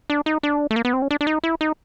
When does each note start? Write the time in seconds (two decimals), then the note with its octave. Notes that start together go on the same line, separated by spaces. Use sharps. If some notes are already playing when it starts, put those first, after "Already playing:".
0.10 D4
0.26 D#4
0.43 D4
0.71 A3
0.76 A#3
0.85 B3
0.93 C4
1.02 C#4
1.11 D4
1.21 D4
1.27 D#4
1.44 E4
1.61 D#4